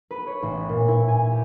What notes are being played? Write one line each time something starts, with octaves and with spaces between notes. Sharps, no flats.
B4
C#5
A1
A#2
E4
G#5
G4